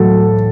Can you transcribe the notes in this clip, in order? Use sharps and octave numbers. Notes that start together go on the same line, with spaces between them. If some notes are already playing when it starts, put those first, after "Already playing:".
Already playing: A2 F#3 A4